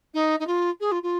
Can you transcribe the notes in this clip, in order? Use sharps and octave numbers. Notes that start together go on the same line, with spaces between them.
D#4
D#4
F4
G#4
F4
F4